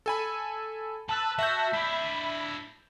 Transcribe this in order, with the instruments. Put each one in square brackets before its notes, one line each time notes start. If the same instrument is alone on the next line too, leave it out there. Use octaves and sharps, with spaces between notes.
[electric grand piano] A4 G#5 B5
[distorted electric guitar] B4 [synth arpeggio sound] A5 E6 F#6
[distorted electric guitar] F#4 [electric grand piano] E5 G6
[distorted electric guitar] D4 E4 [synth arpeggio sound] B5